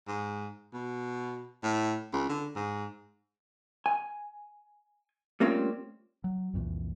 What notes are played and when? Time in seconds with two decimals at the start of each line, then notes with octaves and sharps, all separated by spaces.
0.08 G#2
0.73 B2
1.63 A2
2.13 C#2
2.29 D3
2.56 G#2
3.86 G#5
5.40 G3 A3 A#3 C4 C#4 F4
6.24 F#3
6.53 C2 F2 A#2 E3